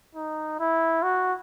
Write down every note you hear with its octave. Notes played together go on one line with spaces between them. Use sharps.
D#4
E4
F#4